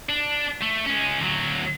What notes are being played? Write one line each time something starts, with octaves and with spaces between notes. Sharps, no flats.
D4
A3
G#3 C#4
D2 F#3